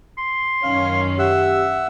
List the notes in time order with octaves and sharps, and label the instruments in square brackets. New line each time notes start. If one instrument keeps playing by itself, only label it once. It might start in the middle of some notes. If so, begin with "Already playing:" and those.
[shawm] C6
[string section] F#2 D#3 C#4 [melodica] F5
[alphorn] G4 [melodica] E5 F#5 E6